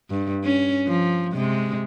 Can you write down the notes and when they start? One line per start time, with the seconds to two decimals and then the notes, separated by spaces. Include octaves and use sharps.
0.10 G2
0.44 C#4
0.87 F3
1.33 C3 G#3